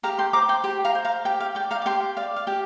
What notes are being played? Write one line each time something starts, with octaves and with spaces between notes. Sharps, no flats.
G4 F5 A#5
G5 C6
C5 A#5 D6
G5 C6
G4 G5
F5 A#5
C5
F5 A#5
G4 G5
F5
D5 G5
F5 A#5
D6
G4 G5 C6
D5 F5
F5
G4 G5